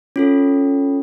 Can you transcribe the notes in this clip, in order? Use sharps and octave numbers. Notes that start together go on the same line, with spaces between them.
C#4 F4 A4